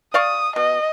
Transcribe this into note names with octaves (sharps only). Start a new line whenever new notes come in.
D5 F5 C#6 D#6
B2 D#5